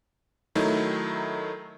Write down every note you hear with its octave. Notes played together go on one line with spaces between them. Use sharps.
D#3 F#3 A3 D#4 E4